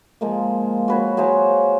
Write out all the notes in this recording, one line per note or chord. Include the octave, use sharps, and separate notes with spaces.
F3 G#3 A#3
F#4 B4 C#5
F#3 G#4 C5 F5